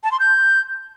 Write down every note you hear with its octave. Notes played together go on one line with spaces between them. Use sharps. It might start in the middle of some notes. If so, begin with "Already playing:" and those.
A5
C6
G6